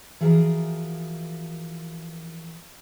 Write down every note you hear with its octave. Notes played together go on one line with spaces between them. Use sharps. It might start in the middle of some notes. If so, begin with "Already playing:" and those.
E3 F3 F#4 G#4 A#4